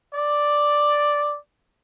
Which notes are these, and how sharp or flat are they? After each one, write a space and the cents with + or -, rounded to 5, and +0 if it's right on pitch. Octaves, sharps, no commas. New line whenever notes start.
D5 +0